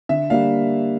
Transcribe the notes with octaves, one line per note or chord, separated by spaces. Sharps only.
D3 E5
G3 A#3 D4 F5